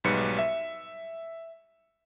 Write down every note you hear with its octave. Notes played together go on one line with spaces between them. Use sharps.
B1 G#2 G3 B4 C#7
E5